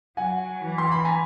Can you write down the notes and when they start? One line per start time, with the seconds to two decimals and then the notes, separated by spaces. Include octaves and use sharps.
0.17 F#3 F#5 G#5
0.61 E3
0.78 C6
0.92 B5
1.05 G#5 A#5